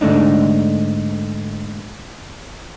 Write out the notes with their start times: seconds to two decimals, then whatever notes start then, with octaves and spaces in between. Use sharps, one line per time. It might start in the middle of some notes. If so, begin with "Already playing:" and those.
0.01 G#2 D3 A3 D4 D#4